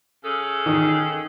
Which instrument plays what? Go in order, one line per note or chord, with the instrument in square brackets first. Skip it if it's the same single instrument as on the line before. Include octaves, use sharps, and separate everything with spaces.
[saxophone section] C#3 G#4 A4
[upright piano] D#3 D#6